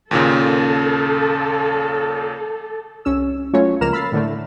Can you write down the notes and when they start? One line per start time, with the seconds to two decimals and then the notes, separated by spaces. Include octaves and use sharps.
0.11 D#2 A#2 C#3 A4
3.05 C2 C#4 E6
3.53 F#3 A3 C#4 F4 C#5
3.81 C#2 F3 A#3 A#5 F6 E7
3.93 B5 E6 F6 A6 C7
4.12 A2 D3 A3